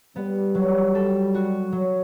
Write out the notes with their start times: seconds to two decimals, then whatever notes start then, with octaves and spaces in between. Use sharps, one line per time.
0.16 G3 B3
0.55 F#3
0.95 A4
1.34 F#4
1.72 F#3